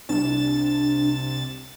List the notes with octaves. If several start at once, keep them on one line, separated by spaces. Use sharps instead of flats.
C2 D4 A6 E7